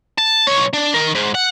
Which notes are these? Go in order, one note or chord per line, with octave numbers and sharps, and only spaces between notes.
A5
B1 C#5
D4
D#3 A#4
G#2
F#5